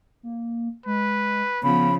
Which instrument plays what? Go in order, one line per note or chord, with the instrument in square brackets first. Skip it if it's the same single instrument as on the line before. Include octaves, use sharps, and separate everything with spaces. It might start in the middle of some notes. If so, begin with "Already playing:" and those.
[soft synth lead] A#3
[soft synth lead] G#3 [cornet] B4
[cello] C#3 F3 [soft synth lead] B3 [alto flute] B5